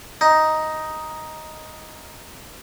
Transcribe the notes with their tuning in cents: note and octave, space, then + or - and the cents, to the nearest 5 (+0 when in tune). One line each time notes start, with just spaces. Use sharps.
D#4 +5